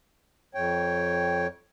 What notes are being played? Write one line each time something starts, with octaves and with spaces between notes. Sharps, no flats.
F2 C#5 G5